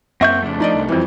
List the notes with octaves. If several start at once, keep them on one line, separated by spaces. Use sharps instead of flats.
F#2 F#3 A#3 C4 E5 F#5 C#6 G6
F2 C#3 A3 D4
F3 D#4 D5 D#5
C2
F2 E3 G3 B3 C4